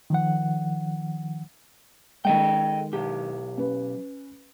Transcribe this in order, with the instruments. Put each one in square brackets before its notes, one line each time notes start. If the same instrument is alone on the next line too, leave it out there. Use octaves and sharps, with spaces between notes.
[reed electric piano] D#3 F3 F#5
[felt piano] D#3 G#3 [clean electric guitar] A4 D#5 G5
[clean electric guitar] B1 G4
[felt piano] C#4 B4